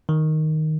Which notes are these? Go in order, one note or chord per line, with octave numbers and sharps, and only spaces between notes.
D#3